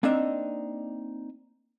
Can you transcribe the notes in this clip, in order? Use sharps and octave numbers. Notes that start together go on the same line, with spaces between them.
A#3 C4 D4 D#4 D#5 E5